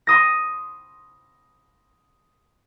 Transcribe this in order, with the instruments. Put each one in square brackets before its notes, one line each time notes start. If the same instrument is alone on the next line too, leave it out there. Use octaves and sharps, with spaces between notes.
[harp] C6 D#6 A#6